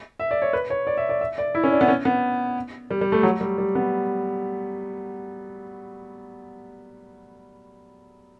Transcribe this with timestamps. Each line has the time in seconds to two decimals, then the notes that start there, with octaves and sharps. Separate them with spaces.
0.19 E5
0.31 D5
0.42 C#5
0.53 B4
0.70 C#5
0.87 D5
0.97 E5
1.09 D5
1.21 E5
1.38 D5
1.55 E4
1.64 C#4
1.72 D4
1.81 B3
1.88 C#4
2.05 B3
2.91 G3
3.01 G3
3.12 A3
3.23 F#3
3.41 G3
3.58 G3
3.75 B3